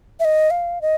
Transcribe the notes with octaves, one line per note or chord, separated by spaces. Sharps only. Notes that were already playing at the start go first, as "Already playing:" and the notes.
E5
D#5
F5
D#5